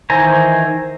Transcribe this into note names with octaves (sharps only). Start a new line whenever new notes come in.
D#3 E3 C5 G#5 A#5